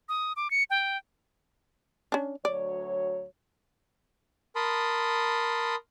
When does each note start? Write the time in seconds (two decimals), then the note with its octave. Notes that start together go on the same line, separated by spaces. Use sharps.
0.09 D#6
0.36 D6
0.51 C#7
0.70 G5
2.12 C#4 D4
2.45 D2 F#3 C#5 D5
4.56 A#4 A5 B5 C6 D#6